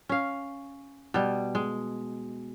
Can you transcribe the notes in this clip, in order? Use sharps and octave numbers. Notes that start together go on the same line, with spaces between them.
C#4 F5
B2 G3
G#3